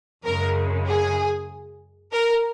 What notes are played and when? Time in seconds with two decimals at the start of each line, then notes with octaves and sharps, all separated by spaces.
0.25 F#2 C#3 G#3 A#4
0.88 G#4
2.12 A#4